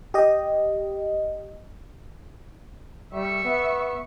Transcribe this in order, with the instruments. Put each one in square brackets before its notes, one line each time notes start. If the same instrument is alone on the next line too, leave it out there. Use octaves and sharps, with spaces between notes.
[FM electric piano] G4 D#5
[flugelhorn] G3 [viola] E5 C#6
[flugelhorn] B3